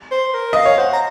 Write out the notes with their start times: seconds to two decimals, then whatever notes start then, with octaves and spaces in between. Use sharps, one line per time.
0.11 C5
0.34 A#4
0.53 D#5 F5
0.66 C#5
0.78 C5 F#5
0.93 A#5